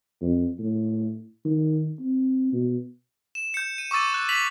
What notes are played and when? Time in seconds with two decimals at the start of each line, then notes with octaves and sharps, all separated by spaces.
0.22 F2
0.60 A2
1.45 D#3
2.00 C4
2.53 B2
3.35 E7
3.54 G6 C#7
3.78 D#7
3.91 C#6 D6 E6 A6 D#7
4.14 F#6
4.29 B6 F7 F#7